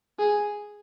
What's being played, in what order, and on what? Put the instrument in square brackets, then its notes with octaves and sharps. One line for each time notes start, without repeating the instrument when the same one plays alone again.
[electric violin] G#4